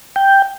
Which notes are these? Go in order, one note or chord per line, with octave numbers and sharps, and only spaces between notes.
G5